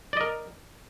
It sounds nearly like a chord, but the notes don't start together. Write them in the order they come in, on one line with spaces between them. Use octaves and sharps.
D5 D#5 A#4